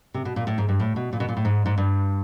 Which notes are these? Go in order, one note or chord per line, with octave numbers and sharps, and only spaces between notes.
C3
B2
A#2
A2
G#2
G2
A2
B2
A#2
B2
A#2
A2
G#2
G#2
G2